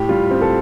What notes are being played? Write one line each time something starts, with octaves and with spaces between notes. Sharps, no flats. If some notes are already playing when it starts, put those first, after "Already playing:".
Already playing: A2 G4
G3 F4
C4
A4